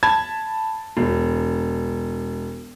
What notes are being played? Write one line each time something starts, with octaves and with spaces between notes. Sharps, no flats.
A5 B5 G#6
E1